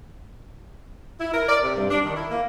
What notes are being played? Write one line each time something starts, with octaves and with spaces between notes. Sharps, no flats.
E4
A#4
D5
C3
G2
D4
D#3
E4
A#3